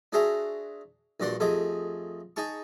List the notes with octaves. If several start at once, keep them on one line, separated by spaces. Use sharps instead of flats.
D4 F#4 G#4 C5 E5 A#5
A#1 G2 F#4 D5 F#5 C6
F2 A3 G4 G#4 D#5
D#4 G#4 A5 C#6